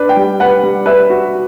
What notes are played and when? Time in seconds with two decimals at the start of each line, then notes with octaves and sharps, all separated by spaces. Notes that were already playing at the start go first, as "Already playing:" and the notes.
Already playing: D4 B4
0.09 G5
0.17 G3
0.40 B4 F#5
0.63 G3
0.86 B4 E5
1.10 F#4